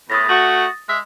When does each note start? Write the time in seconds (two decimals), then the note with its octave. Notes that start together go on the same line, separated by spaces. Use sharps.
0.10 E2 A2 D#6 A6 A#6
0.29 A3 F#4
0.89 G#3 G#4 E5